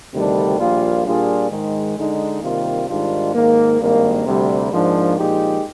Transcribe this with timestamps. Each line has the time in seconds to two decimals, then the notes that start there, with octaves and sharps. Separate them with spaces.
0.13 D2 C3 D#3 G3 D4
0.59 A#1 A#2 G3 A#3 F4
1.05 A#2 G3 D4 F4 G#4
1.50 G#2 D#3 G#3
1.97 D3 G#3 D#4
2.42 C3 D#3 G3 A#3 F4
2.88 G#2 D#3 G3 D4 F4
3.34 G#2 D#3 A#3
3.80 G#1 G2 D#3 A#3
4.25 D2 C3 G3
4.72 G#2 F3 A#3 D4
5.17 A#2 F3 G#3 D#4 G4